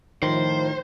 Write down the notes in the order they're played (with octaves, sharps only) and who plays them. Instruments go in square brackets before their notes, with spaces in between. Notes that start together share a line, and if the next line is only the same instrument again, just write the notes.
[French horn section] A2 F3 [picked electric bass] D#3 [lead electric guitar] C5